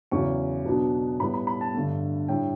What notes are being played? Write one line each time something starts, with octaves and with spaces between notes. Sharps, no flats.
E2 C#3 F#3 C#4 E4 C#6
B2 F#3 B3 D4
A2 G3 B3 B5
B5
B5
A5
G2 D3 A3
A2 G3 D4 G5